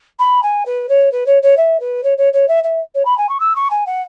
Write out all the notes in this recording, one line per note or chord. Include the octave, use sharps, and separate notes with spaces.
B5
G#5
B4
C#5
B4
C#5
C#5
E5
B4
C#5
C#5
C#5
E5
E5
C#5
B5
G#5
C#6
E6
C#6
G#5
F#5